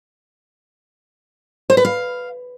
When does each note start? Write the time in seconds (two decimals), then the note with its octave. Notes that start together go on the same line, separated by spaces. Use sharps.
1.70 C5
1.77 B4
1.85 F5